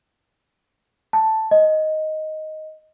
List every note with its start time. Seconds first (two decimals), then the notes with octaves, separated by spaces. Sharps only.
1.13 A5
1.51 D#5